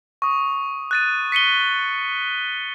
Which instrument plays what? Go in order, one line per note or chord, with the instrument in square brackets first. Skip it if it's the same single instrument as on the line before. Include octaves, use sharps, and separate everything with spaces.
[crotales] C#6 D#6
F#6 A6 D#7
B6 C#7 D#7 G7